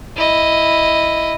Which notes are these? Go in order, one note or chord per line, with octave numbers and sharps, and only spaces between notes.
E4 D#5